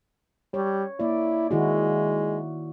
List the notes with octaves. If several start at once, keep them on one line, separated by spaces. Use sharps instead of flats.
G3 C#5
A#3 E4 D5
D#3 G#3 E4 F#4